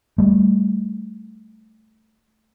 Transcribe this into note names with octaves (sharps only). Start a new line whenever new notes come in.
G3 A3